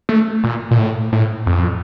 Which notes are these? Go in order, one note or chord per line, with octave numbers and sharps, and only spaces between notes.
A3
A#2
A#2
A2
A2
F2